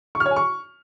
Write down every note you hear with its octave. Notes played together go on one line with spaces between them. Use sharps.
C#6
F6
C#5
G#5
C#6